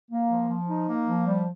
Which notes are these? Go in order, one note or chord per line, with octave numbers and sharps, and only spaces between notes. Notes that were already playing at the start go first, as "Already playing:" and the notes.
A#3
F3
F3
D#4
A#3
F3
G3